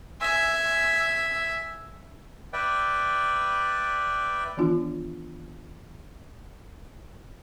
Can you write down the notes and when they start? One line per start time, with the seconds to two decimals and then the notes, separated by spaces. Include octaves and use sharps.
0.21 E5 G#5
2.53 B4 D5 E5 G5
4.57 D#3 E3 B3 D4 F4